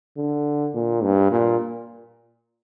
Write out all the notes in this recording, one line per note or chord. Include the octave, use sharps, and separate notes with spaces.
D3
A#2
G2
A#2